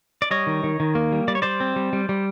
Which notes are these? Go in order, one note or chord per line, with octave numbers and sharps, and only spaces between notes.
D5
G3 C#5 D#5
D#3
D#3
D#3
A#3
G3
G3 D5
C#5
G3 C5 D5
C4
G3
G3
G3